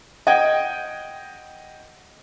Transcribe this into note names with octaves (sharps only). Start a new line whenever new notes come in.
D#5 F#5 G5 G#6